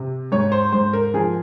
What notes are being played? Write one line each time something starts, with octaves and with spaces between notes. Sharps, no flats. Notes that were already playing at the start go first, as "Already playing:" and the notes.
Already playing: C3
G#2 C#5
C5
G#2 C5
A#4
F3 G#4